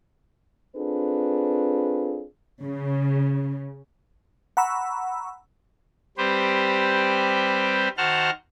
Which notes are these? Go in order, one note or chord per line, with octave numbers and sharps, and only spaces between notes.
C4 D4 F4 G#4 A4 B4
C#3
F#5 A#5 B5 C#6 E6
G3 C4 G4 B4 C5
D#3 F#4 C5 F#5 A5 F6